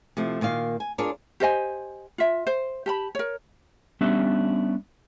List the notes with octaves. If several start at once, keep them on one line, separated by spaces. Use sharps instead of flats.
C3 F3 A3
A#2 D#3 A#3 F5
G#5
D4 F4 G#4 A#4 C#5 D5
G4 C5 D#5 G#5
F4 E5
C5
G4 A5 B5
A#4 C#5
G3 B3 C#4 D4 E5